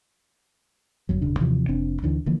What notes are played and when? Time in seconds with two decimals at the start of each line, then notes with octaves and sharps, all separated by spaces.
1.09 G1 F2 F#3
1.21 D#1 C#3 D4
1.40 D#2 C3 E3 F3
1.68 F1 C4 D4
2.03 D2 D3 E3
2.26 D3 E3 F3 A#3